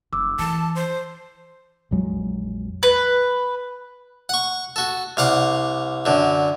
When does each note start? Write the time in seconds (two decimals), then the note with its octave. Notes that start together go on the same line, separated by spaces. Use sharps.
0.13 F1 D6 E6
0.39 E3 A5
0.76 C5
1.91 A#1 F2 F#3 G#3
2.83 B4
4.29 F#5 C#6
4.76 F#4 A4
5.17 C2 F5 F#5 D6
6.06 F#2 D3